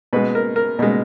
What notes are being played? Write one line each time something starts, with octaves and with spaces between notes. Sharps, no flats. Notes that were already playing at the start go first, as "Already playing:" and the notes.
B2 G#3 B4
A#4
A#4
B2 G#3